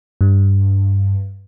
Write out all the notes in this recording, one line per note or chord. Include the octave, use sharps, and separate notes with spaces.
G2